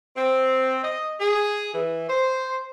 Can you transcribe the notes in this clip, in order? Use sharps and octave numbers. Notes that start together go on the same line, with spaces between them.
C4
D#5
G#4
E3
C5